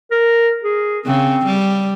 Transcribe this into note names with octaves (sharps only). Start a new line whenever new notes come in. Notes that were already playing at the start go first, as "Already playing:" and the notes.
A#4
G#4
C#3 C4
G3